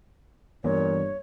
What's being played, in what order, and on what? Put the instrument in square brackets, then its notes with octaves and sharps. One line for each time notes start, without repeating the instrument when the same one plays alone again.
[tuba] G2 [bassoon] A#2 [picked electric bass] E3 A#3 B3 [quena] C#5